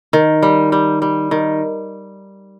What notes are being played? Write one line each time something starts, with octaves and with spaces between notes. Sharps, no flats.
D#3
G3
G3
G3
D#3